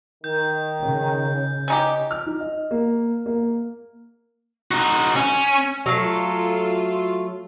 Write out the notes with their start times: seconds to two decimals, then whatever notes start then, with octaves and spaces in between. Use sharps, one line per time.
0.24 D#3 G6
0.82 C#3
1.68 C#4 D#4 G4
2.11 F6
2.26 D#4
2.40 D#5
2.71 A#3
3.26 A#3
4.71 D#4 F#4
5.16 C#4
5.86 F#3 A3 F4 A4 F5